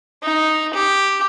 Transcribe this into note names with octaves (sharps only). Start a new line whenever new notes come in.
D#4
G4